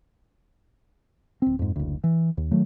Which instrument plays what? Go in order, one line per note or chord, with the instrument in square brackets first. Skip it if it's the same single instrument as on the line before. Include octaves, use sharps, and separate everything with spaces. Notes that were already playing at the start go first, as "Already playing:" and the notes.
[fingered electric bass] D1 C4
F2 G#2
F#1 D2
E3
D#2
D#3 F#3 A3